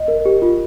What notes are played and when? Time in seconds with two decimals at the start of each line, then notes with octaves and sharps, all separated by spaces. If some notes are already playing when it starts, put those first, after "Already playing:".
Already playing: D#5
0.08 A#4
0.25 G4
0.42 F4